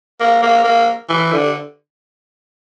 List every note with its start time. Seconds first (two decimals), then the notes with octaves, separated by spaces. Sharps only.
0.20 A#3
0.42 A#3
0.64 A#3
1.09 E3
1.33 D3